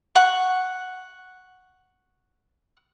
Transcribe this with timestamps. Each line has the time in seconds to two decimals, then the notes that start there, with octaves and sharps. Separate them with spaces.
0.15 F#5 C#6